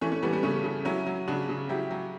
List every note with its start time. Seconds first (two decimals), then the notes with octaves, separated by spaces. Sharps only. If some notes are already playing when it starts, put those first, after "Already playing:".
0.01 E3 A3 C#4
0.12 A3 C#4
0.22 E3 G3 B3
0.33 G3 B3
0.43 C#3 A3 C#4
0.64 C#3
0.85 F#3 C#4 E4
1.06 F#3
1.28 C#3 D4 F#4
1.49 C#3
1.69 F#3 E4 G4
1.91 F#3